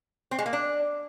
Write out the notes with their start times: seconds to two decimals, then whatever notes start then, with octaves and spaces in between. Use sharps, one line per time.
0.31 C4
0.38 G#3
0.46 A#3
0.53 D4